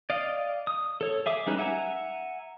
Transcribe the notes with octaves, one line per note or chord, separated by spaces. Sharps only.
D5 D#5 F5
D#6
A4 C#5
G#4 E5 D6
G3 G#3 C#4 D#4 B4
E5 F#5 G#5 A#5